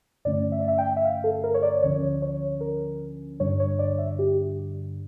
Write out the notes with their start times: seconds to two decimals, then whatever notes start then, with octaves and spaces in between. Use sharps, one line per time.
0.25 G2 D3 A3 C#4 D5
0.52 E5
0.60 D5
0.68 E5
0.78 G5
0.97 E5
1.05 F5
1.24 A4
1.44 A#4
1.54 C#5
1.62 D5
1.83 D2 D3 F3 C#4 C#5
2.22 C#5
2.61 A#4
3.39 G2 D3 G3 D4 C#5
3.60 C#5
3.79 D5
3.98 E5
4.19 G4